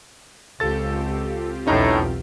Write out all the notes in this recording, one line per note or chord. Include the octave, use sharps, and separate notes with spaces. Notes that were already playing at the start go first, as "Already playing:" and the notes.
C#2 C4 F4 G4 A4 A6
B1 E2 A2 C#4 D#4 A#5